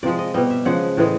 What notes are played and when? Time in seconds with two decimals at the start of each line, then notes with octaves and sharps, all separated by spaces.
0.03 C3 F3 G#3 D5
0.19 D#5
0.34 B2 G3 D#5
0.50 E5
0.65 C#3 F3 G#3 F#5
0.97 A2 E3 G#3